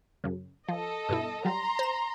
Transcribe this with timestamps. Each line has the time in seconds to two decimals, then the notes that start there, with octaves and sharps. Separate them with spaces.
0.24 F#2 C#3
0.68 F3 A4 D#5
1.09 G2 B2 E4
1.45 F#3 G3 A#5 C6
1.79 C5 E7